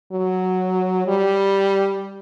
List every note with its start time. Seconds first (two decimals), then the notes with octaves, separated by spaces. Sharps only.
0.12 F#3
1.07 G3